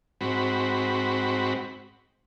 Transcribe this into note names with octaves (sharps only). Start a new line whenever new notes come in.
G#2 C4 F#4 B5